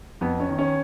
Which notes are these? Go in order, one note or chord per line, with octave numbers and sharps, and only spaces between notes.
F2 B3
C#4
D#3
C#4